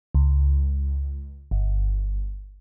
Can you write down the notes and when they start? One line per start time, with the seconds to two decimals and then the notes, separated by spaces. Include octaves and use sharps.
0.15 C#2
1.51 G1